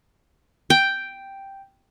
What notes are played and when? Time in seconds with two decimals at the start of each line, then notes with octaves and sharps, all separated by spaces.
0.70 G5